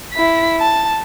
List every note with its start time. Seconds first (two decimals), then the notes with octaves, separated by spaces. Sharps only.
0.13 E4 B6
0.60 A5